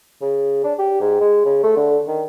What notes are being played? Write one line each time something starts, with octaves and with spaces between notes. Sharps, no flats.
C#3
D4
G4
G#2
G#3
C#3
A3
D3
D#3